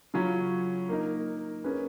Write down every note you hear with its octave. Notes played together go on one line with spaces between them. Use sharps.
C#3 F#3 C#4 F4
A#3 D#4 A#4
A#3 C#4 G#4 B4